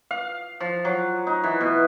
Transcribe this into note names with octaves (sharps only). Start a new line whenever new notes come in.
F5
F3
F#3
D#4
E3
B2